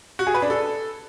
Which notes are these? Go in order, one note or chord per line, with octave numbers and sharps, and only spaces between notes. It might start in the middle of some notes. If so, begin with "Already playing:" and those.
F#4
G#4
B4
D4
A4